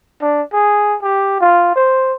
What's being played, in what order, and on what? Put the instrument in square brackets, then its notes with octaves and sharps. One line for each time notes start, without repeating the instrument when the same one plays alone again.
[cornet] D4
G#4
G4
F4
C5